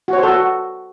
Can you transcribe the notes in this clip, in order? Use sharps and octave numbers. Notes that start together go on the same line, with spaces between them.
F#4
C#5
C5
A4
F#4